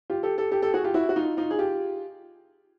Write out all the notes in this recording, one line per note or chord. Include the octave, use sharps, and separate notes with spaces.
F4 G4
G4 A4
G4 A4
G4 A4
G4 A4
F#4 G#4
F4 G4
E4 F#4
F#4
D#4 F4
D#4 F4
G#4
F4 G4